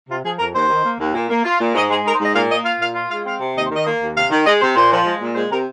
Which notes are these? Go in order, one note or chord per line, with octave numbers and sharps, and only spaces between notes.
C3 F4
F3 G#4
F2 A#4
D#2 C5
D#3
A#3
D#2
A#2
A#3
F4
A#2
G#2 D#5
G#3 G#4
D#4 A#4
C5
G#2 D#5
A#2 F5
A#3 D#5
F4 F5
A#2 F5
F4
G#3 F5
C4 F5
C3
D#2 D#5
C5
D#3
D#5
A#3
D#2
C3 F5
D#3
G#3 D#5
C3 C5
A#2 C5
F3
G#3
A#2
G#3 C5
C3 A#4